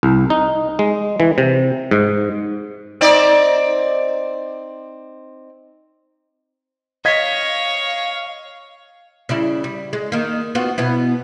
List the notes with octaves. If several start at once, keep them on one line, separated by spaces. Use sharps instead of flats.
C2
D#4
G#3
E3
C3
G#2
C4 D#4 D5
C#5 D#5 F5 G#6 B6
C#3 G3 E4
G3
G#3
D#3 A#3
B3 F4 F#4
B2 B3 E4